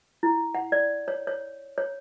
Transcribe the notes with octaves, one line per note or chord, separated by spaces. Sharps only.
E4
F#5
D5
C#5
C#5
C#5